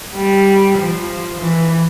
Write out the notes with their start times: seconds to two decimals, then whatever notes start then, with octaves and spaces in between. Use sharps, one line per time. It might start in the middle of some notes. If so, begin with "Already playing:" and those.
0.15 G3
0.78 F3
1.41 E3